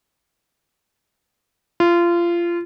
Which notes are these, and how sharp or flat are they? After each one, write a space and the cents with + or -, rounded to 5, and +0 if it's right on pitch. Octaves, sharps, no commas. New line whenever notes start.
F4 -25